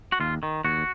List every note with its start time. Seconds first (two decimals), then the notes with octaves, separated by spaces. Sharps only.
0.12 F#4
0.20 D#2 F4
0.43 D#3
0.65 D#2 F#4